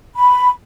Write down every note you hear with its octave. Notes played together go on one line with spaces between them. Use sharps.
B5